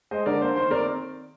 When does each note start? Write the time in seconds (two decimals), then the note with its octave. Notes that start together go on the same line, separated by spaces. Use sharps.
0.11 G#3 C5 D#5
0.26 D3 A#4 D5
0.41 A#3 C5
0.56 D#3 C5
0.71 C4 A#4 D5